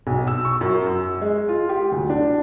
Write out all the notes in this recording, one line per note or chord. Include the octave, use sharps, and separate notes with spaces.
B1
E6
C#6
F#2
E6
G#3
F4
G4
D2
D4